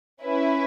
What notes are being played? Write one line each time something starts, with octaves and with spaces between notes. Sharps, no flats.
C#4 E4 B4 E5